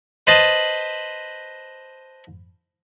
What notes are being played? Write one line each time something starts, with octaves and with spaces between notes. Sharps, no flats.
B4 C5 D#5 A5 B5